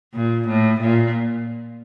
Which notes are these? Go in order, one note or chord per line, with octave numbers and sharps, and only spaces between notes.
A#2
A2
A#2